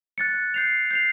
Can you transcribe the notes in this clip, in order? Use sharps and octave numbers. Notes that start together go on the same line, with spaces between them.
F#6 A6 C#7
G6 C7 F7
G6 C7 F7